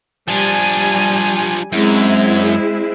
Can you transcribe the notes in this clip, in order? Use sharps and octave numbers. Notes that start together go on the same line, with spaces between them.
F3 G3 D4 G#5
F#2 G#3 C4 E4